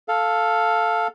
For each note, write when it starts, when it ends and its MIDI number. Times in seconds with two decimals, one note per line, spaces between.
0.08 1.08 69
0.08 1.08 77